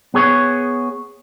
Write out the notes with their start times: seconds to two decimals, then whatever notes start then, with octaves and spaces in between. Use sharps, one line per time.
0.14 B3 G#4 C#5